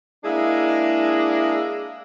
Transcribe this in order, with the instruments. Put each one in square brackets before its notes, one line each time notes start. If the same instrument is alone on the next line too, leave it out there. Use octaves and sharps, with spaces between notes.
[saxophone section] G#3 A#3 D4 E4 G#4